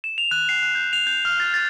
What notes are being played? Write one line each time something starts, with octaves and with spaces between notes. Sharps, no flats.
E7
F7
F#6
C7
F#6
G6
F7
G6
F6
A6
A6